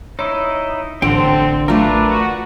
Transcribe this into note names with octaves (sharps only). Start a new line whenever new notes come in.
D#4 E4 C#5 D#5
A1 D3 C4 A4 G5
A3 D4 F4 A#4 B4
F#4